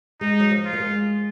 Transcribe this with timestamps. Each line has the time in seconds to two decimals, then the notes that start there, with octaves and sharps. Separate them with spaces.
0.21 G#3 D#4
0.40 F#3
0.51 F3
0.65 F4
0.73 A#3
0.80 G#3